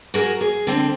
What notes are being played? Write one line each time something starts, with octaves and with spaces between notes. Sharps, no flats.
F#4 G#4 A#4
G#4
D3 C4